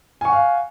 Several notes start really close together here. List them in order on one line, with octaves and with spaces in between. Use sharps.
G#5 C#6 F#5 F5